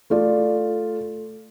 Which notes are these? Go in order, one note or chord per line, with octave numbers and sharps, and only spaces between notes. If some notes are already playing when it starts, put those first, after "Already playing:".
A3 F4 D5